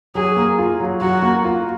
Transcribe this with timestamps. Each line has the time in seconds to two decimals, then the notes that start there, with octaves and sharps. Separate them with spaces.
0.15 F#3 G#4
0.36 A#3
0.58 F4
0.80 F#3
1.01 F#3 F#4
1.22 A#3
1.44 F4